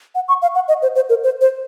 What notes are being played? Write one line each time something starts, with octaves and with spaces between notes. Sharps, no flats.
F#5
C#6
F5
F#5
D#5
C5
C5
A#4
C5
C5